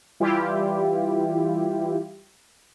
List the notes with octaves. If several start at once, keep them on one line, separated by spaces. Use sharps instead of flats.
E3 G3 E4 F4 G4